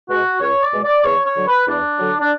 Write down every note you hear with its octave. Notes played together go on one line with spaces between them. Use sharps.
B2 G#3 F#4
C#2 C#5
D5
B2 G#3
D5
E2 C#5
C#5
D3 F#3
B4
E2 D4
D3 F#3
D4